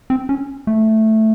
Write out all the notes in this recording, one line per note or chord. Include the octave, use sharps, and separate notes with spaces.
C4
C#4
A3